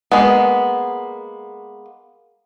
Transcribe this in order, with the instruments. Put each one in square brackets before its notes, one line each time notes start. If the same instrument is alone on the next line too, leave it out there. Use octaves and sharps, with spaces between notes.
[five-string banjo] G#3 A#3 B3